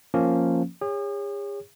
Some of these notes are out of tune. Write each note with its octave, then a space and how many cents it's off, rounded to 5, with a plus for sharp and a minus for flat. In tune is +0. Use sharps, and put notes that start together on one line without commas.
F3 -5 A#3 -10 C#4 -15
G#4 -45 C#5 +0